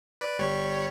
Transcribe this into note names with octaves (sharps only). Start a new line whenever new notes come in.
B4 D5
G1 G3 C#5